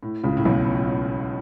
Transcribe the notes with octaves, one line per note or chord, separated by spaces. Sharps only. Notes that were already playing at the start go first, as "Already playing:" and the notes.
A2
C#2 C#3
A2
B1 B2